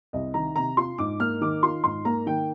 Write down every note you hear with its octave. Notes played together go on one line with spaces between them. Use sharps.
C2 D#5
D#3 A#5
C3 A#5
F4 C6
G#2 D6
A#3 F6
D#3 D6
F4 C6
G#2 C6
A#3 A#5
D#3 G5